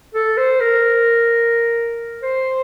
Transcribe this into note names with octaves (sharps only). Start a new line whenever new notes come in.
A4
C5
A#4
C5